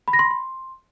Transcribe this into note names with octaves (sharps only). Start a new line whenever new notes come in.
B5
A#6
C6
B5
C6